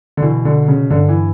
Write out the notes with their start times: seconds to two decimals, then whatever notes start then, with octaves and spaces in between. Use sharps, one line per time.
0.17 D3
0.22 B2 E3
0.45 D3
0.68 C#3
0.90 G2 D3
1.09 E3